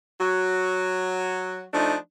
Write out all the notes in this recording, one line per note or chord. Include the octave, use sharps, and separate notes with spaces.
F#3 F#4
F3 A3 D4 D#4